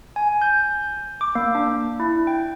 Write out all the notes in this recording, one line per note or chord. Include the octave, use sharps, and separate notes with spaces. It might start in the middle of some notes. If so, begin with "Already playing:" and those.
G#5
G6
D6
A#3
D4
E4
G5